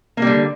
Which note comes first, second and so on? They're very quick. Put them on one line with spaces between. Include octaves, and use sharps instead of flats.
A#3 G3 D3